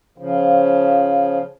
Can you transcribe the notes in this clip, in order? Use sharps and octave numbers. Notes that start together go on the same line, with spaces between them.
C#3 F3